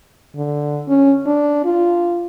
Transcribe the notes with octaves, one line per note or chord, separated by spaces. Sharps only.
D3
C#4
D4
F4